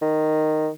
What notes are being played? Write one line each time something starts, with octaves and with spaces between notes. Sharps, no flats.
D#3